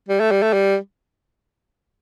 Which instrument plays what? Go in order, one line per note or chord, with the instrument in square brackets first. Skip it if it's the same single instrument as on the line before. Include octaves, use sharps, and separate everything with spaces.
[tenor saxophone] G3
A3
G3
A3
G3